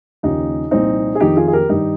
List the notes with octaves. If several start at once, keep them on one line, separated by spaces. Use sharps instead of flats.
D#2 C#3 F3 D#4 G4
C2 A#2 F3 C4 D#4
G#4
F2 D#3 D#4 G4
F4 G#4
G#4
G4 A#4
G2 D#3 D#4 G4